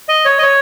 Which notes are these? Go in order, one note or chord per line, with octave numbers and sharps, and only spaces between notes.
D#5
C#5
D#5
C#5